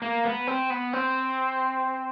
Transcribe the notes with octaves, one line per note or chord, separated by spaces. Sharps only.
A#3
B3
C4
B3
C4